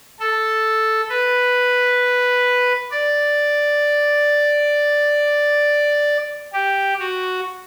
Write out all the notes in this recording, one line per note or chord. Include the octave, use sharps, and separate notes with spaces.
A4
B4
D5
G4
F#4